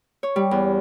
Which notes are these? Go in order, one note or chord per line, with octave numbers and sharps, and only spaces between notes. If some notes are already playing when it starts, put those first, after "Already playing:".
C#5
G3
E2